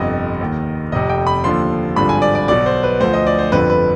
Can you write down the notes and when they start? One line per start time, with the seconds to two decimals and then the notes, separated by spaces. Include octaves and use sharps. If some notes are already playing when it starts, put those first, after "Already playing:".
Already playing: G1 F2 C3 D#5
0.40 D#2 D#3
0.92 F1 F2 C3 D#5
1.09 G5
1.27 B5
1.44 D#2 D3 F3 C6
1.96 G#1 G2 D3 F3 B5
2.09 G#5
2.22 D5
2.35 D5
2.48 B1 B2 D5
2.66 C5
2.83 B4
3.00 D2 D3 F3 C5
3.13 D#5
3.27 D5
3.39 C5
3.52 G1 F2 D3 F3 B4
3.70 B4